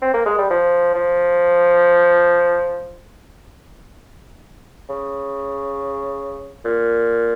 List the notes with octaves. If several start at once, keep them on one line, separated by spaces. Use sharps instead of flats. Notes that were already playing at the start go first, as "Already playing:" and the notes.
C4
A#3
G#3
G3
F3
F3
C#3
A#2